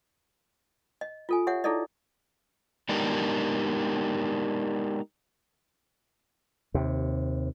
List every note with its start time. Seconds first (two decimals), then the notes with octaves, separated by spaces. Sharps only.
1.01 D#5
1.29 F4 A4 G#5
1.47 G4 C#5 E5 F#5
1.64 D#4 E4 G#4 A4 D5 D#5
2.89 G#3 B3 D4 D#4 G4 A#4
6.74 D#2 C3